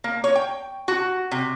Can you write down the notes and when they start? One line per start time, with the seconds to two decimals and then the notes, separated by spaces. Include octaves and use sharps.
0.04 A#3
0.24 C#5
0.35 G5
0.88 F#4
1.31 C3